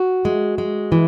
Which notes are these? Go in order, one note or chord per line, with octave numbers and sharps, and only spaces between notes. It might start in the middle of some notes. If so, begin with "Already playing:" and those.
Already playing: F#4
G#3
G#3
E3